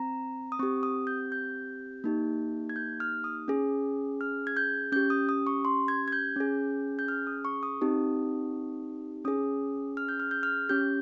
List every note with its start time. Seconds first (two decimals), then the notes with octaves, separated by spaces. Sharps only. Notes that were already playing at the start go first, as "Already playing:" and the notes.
Already playing: C4 A#5
0.52 D#6
0.59 C4 G4 C#6
0.83 D#6
1.07 G6
1.32 G6
2.04 A#3 D#4 G4
2.69 G#6
2.76 G6
3.00 F6
3.24 D#6
3.48 C#4 G#4
4.21 F6
4.47 G#6
4.57 G6
4.92 C#4 G4 G6
5.10 D#6
5.29 D#6
5.47 C#6
5.65 C6
5.88 G#6
6.08 G#6
6.12 G6
6.36 C#4 G#4
6.99 G6
7.08 F6
7.27 D#6
7.45 C#6
7.63 D#6
7.81 C4 D#4 G4
9.25 C#4 G#4 D#6
9.97 F6
10.09 G6
10.20 F6
10.31 G6
10.43 F6
10.69 C#4 G4 G6